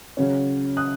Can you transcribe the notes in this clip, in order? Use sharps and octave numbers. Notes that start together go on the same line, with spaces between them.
C#3 F#3 C#4
D#6 F#6